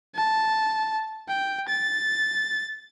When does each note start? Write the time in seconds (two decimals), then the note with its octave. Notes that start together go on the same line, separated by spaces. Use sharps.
0.16 A5
1.28 G5
1.68 A6